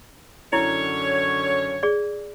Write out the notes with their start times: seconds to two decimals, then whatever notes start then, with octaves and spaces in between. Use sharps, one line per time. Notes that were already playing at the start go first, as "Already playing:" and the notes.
0.53 F#2 D3 E4 C#5
1.83 G#4 D5